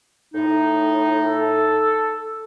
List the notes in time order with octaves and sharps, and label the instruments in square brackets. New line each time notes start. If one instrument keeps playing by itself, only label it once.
[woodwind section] A2 D#4
[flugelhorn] A4